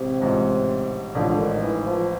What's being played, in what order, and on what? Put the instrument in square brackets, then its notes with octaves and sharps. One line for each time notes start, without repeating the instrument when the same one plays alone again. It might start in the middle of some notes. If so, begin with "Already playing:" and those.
Already playing: [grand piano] A1 G#2 [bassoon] C3
[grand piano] A1 G#2 F3
[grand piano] A1 G#2 F3 [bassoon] D3
[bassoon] D#3
E3
F3